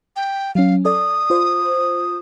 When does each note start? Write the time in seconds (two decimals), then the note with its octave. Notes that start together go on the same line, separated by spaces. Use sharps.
0.16 G5
0.55 F#3 C#4 F5
0.85 A4 D5 D#6
1.30 F4 C5